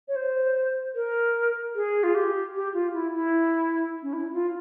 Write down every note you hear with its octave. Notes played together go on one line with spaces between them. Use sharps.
C#5
C5
A#4
G#4
F4
G4
G4
F4
E4
E4
C#4
E4
F4